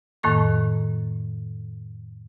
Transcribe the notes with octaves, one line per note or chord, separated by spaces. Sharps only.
F2 A2 D#3 A#3 A4 C#6